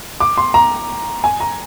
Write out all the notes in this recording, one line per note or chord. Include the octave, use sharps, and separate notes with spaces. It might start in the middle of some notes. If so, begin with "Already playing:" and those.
D6
C6
A#5
G#5
A#5